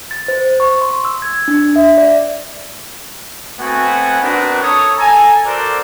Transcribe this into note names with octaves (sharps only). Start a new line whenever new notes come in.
A6
C5
C#6
C6
E6
G#6
D4
E5
D5
A3 B3 C4 F#4 F#5 G#5
C4 D4 D#4 F#4 A#4 B4
A4 C#5 D#6
A4 G#5 A#5
F#4 A4 A#4 C5 D5